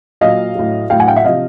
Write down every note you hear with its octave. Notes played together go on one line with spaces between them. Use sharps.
A#2 F#3 D#5 F5
A2 F#3
A2 F#3 F5 G5
F#5 G#5
F5 G5
E5 F#5
C3 F3 D#5 F5